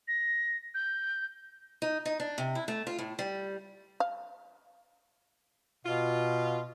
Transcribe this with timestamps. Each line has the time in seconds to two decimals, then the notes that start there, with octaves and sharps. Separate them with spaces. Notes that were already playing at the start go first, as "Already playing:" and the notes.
0.08 A#6
0.74 G6
1.82 D#4
2.06 D#4
2.20 D4
2.38 C3
2.55 E4
2.68 A3
2.87 F4
2.99 A2
3.19 G3
4.00 F5
5.85 B2 F4